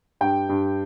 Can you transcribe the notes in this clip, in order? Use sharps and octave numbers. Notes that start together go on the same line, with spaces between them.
G2 G5
G2